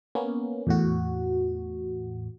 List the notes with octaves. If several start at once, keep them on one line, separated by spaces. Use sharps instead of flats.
A#3 B3 C#4
E2 A2 F#4